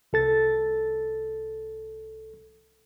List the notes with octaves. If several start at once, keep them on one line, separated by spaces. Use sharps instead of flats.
C2 A4 A6